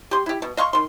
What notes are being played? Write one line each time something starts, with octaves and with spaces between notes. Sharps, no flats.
G4 C6
E4 G4
B2
D#5 F5 C6 C#6
D#3 C6